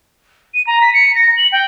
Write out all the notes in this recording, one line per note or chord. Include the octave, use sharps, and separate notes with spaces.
D#7
A#5
B6
C#7
A#6
F#7
G5